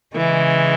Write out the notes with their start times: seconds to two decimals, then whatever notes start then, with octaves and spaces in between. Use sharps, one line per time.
0.15 C#3 E3 G#3